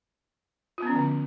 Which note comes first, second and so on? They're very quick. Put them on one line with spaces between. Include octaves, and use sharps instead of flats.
F4 B3 C#4 F3 D3